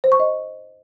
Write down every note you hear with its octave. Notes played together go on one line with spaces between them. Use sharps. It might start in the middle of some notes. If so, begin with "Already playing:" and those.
C5
C#6
D#5